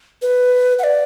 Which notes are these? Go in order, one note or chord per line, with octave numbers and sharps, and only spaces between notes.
B4
F#5
D5